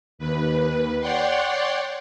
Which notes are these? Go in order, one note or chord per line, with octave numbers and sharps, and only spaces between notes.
D#2 B4
C#5 D5 F#5 G5 C6